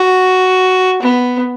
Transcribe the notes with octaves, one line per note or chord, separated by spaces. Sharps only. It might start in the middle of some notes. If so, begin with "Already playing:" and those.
Already playing: F#4
B3